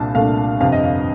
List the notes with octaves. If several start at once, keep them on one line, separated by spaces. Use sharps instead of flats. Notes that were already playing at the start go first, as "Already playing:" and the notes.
Already playing: C2 A#2 D4 A5
C2 A#2 A3 D4 F5
G1 F2 C3 F5
D#5
F5